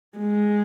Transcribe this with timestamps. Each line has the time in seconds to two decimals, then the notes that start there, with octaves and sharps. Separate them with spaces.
0.18 G#3